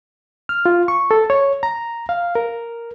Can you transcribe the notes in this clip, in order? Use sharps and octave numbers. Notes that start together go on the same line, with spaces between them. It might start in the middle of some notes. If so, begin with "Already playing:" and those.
F6
F4
C#6
A4
C#5
A#5
F5
A#4